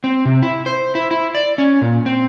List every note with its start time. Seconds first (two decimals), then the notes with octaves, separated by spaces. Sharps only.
0.04 C4
0.25 C3
0.42 E4
0.66 C5
0.95 E4
1.11 E4
1.35 D5
1.58 C#4
1.81 A#2
2.06 C4